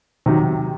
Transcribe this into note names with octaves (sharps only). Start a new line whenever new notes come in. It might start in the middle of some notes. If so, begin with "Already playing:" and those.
C3 D#3 F#3